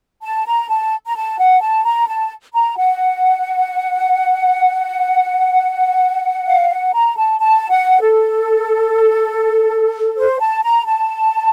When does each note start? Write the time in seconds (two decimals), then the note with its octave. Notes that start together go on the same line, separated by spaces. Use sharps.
0.23 A5
0.46 A#5
0.69 A5
1.06 A#5
1.16 A5
1.39 F#5
1.61 A5
1.85 A#5
2.08 A5
2.54 A#5
2.77 F#5
6.47 F5
6.70 F#5
6.93 A#5
7.17 A5
7.40 A5
7.70 F#5
8.01 A4
10.17 C5
10.40 A5
10.63 A#5
10.86 A5